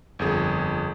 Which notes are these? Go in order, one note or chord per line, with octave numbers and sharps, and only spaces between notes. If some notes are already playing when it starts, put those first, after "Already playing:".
G1 F2 G#4